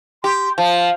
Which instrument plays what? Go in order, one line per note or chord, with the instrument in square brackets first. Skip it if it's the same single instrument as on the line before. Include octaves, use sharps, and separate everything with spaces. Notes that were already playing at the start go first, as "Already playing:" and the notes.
[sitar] G4 [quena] C6
[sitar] F3 [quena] F5 [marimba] A5